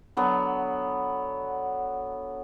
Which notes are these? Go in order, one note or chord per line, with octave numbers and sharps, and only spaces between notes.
D3 F#3 B3